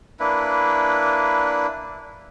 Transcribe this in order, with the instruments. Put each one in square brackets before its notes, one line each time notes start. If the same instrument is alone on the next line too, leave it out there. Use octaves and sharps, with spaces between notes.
[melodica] A#3 D4 E4 B4